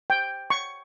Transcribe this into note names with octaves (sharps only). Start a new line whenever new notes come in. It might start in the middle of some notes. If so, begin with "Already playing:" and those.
G5
C#6